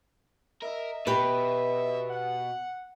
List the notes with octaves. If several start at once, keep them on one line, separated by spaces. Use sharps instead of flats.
A#4 D#5 E5
B2 G4 B4
F#5